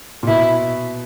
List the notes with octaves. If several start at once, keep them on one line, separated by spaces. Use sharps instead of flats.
A#2
B2 E4